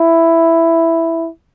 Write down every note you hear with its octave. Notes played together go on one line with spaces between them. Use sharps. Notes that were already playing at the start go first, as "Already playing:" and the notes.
Already playing: E4